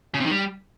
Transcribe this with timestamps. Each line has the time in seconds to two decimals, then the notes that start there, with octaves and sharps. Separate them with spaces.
0.14 C#3
0.20 C3
0.26 D#3
0.31 G3